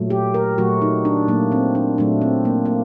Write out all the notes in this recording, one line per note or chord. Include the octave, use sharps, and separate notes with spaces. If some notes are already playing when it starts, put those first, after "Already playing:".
Already playing: A#2 F#3 A3
G4
A#4
A#2 F#3 A3 F#4
D#4
D4
A#2 F#3 A3 A#3
C4
D4
A#2 F#3 A3 D4
C4
A#3
A#3